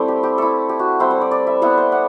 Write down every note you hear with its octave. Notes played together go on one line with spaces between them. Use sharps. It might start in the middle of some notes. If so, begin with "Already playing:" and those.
Already playing: G3 A3 C4 E4 C5 D5
G4
G4
A3 E4 A4
G4
F#4
G3 C4 E4 C5
C5
D5
D5
E5
G3 B3 E4 F#5
C5
F#5